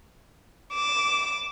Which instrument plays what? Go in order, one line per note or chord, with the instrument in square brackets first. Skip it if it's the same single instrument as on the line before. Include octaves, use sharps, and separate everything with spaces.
[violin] D6 E7